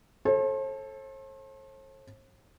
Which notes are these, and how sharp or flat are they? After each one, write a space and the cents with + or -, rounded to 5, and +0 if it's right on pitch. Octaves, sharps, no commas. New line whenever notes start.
A4 -10 C5 +45